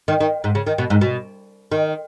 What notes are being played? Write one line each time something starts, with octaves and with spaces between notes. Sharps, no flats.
D#3
D#3
G#2
C#3
D#3
B2
G#2
B2
D#3